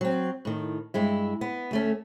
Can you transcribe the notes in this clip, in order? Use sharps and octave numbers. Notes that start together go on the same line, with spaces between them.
F#3 C4
A2 D#3
G2 G#3 E4
B3
D2 A3 C#4